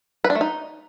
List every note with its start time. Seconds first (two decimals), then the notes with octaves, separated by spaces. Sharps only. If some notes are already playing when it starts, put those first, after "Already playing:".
0.24 B4
0.30 D4
0.35 A3
0.41 D#4